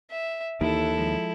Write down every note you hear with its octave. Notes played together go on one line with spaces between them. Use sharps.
E5
D#2 D#3 E3 E4 A4
F3 G#3